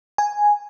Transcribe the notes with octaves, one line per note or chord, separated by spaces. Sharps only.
G#5